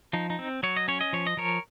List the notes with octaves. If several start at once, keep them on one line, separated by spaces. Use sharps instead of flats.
F3 D#4
D#4
C4
F#3 C#5
D#5
C#4 C#5
D#5
F3 C#5
D#5
F3 A#4 C#5